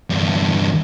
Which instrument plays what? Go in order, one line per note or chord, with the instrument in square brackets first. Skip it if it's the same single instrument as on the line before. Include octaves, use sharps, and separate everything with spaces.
[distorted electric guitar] E2 G2